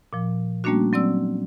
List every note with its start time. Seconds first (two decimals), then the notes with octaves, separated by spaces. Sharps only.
0.13 A#2 F3
0.64 G3 A3 A#3 C#4 D4 F#4
0.93 F#3 C4 D5 E6